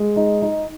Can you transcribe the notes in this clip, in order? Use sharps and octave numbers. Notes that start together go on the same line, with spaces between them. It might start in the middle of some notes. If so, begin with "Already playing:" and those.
Already playing: G#3
D#4
D#4